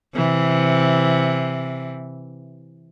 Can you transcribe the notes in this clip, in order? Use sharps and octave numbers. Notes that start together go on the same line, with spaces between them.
C3 E3